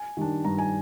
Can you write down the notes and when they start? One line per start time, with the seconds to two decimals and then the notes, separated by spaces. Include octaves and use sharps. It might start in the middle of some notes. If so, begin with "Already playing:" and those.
Already playing: G#5
0.17 D#3 G3 D4
0.44 G2 A#5
0.58 G#5